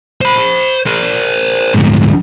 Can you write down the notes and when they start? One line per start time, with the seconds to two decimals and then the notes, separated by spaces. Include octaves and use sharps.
0.21 C5 B5
0.86 A#4 C5
1.74 D2 G#2